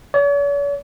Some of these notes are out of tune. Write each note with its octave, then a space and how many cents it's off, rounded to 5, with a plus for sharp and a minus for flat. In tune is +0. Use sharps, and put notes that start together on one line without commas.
C#5 +45